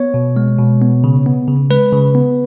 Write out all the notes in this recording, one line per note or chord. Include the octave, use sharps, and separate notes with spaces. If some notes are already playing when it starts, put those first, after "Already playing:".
Already playing: B3 C#5
B2
G#3
B2
B3
C#3
B3
C#3
G#3 B4
C#3
B3